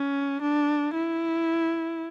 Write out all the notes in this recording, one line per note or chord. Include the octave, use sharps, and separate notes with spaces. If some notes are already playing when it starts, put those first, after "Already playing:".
Already playing: C#4
D4
E4